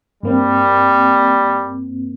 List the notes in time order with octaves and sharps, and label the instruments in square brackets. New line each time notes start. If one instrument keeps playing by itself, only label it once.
[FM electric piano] G2 A#3 C4 [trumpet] G3